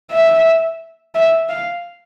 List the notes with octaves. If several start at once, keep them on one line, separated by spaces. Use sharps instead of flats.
E5
E5
F5